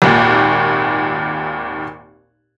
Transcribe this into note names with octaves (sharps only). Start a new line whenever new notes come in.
G#1 D#2 A#2